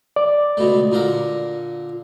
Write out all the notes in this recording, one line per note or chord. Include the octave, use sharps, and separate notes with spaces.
D5
C#2 B2 A3
A#2 D3 A#4